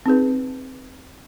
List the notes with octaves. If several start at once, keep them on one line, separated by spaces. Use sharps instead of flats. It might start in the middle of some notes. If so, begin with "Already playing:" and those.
C4 D#4 G#4 B4